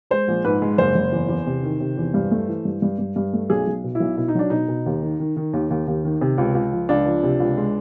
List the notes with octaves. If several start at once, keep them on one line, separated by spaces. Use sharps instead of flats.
G#3 C5
A#1
G#2 B4
G#3
F#1 C5
F#1
E2
E2
C3
D#3
C3
E2
G2
A3
E3
G2
G2
G2
G2
A3
B1 G#4
B1
B2
E4
B1
B2 E4
D#4
F#3 D4
B2 D#4
B2
D#2
D#3
D#3
D#3
D#2
D#2
D#2
D#3
C3
C#2
C#2
F3
C#2 D4
F3
C3
C#2
G#3